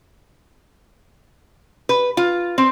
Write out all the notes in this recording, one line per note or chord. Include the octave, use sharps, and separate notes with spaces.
B4
F4
C4